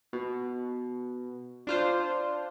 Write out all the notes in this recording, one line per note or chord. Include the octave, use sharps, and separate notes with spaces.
B2
D4 F4 C5